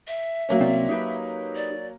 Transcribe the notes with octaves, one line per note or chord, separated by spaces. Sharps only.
E5
F#3 A#3 C#4
C2 C4 D5
D#4 G4 B4
D5